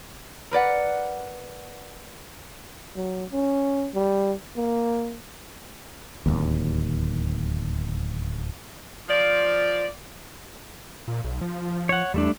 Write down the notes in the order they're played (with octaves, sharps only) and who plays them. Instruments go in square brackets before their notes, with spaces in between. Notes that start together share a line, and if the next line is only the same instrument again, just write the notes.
[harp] A#4 B4 D5 F#5
[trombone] F#3
C#4
G3
A#3
[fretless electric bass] D1 G#1 D#2
[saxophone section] F3 D5
[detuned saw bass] A#2
B1
F3
[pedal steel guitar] C#5 F#5
[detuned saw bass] E2 [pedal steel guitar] G3 A3 D4